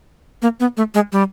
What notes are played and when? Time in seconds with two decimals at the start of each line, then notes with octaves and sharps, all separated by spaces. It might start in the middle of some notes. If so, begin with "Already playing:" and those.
0.42 A#3
0.60 B3
0.77 A3
0.94 G#3
1.12 G3